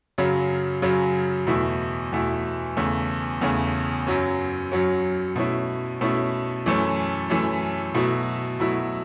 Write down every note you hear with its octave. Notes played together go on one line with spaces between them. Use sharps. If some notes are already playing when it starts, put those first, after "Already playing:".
F#2 C#3 F#3
F#2 C#3 F#3
E2 B2 A3 E4
E2 B2 A3 E4
E2 C#3 A3
E2 C#3 A3
F#2 F#3 C#4
F#2 F#3 C#4
B2 A3 C#4 E4
B2 A3 C#4 E4
F#2 E3 A3 C#4
F#2 E3 A3 C#4
B2 F#3 A3 E4
B2 F#3 A3 E4